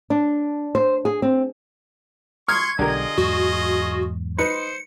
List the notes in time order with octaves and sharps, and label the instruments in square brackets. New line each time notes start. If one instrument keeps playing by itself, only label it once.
[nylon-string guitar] D4
C5
G#4
C4
[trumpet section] C6 C#6 [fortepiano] D#6 F6 [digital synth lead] G#6
[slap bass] B1 [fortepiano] D3 G4 A#4 [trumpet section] F4 G#4 D#5
[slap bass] E2 G#2 F#3 [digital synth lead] F#4
[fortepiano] D#4 B4 [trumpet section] C5 [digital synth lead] C#7